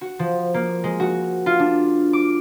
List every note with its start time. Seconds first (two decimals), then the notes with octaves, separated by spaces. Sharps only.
0.01 F#4
0.19 F3
0.54 A#3
0.84 G#3
1.00 F#4
1.46 F4
1.59 D4
2.13 D6